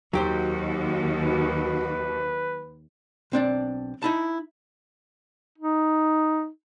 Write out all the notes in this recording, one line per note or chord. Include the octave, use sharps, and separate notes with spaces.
D#2 F#3 F#4 G4 C5
B4
B1 C4 D4 D5
D#4 E4 A5
D#4